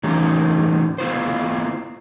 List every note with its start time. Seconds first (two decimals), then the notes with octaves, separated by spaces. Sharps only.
0.03 A2 E3 C#4 D#4 G4
0.98 B3 E4 F4 C5